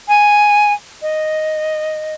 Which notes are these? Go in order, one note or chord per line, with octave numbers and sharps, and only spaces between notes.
G#5
D#5